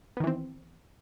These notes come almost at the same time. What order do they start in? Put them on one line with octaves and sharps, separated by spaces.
B3 D#3 E3 C4